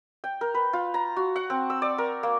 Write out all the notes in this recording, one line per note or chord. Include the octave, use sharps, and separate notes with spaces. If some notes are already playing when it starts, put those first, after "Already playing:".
G5
A#4
B4
F4
A#5
F#4
F#5
C4
E6
D5
A#4
A#3